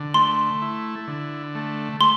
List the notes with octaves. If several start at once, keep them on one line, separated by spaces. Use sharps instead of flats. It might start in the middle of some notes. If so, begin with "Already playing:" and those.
Already playing: D3
A3 C6
E4
D3
A3
A3 C6